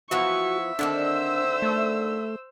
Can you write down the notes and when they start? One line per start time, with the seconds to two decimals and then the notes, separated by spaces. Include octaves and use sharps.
0.11 E3 F3 B3 F#4 E5 C#6
0.79 D3 D#3 C4 D4 C5 E6
1.62 A3